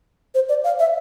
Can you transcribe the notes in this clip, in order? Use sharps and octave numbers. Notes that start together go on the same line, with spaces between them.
C5
D5
F5
E5